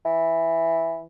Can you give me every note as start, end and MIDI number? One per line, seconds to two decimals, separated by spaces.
0.05 1.03 52